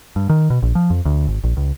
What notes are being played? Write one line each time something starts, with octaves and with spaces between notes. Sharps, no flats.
G2
D#3
B2
A#1
F3
F2
D2
G#1
A#1
C#2